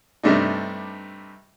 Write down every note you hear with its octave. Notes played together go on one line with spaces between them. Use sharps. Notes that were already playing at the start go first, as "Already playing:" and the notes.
G2 C3 G3 A3 D4 D#4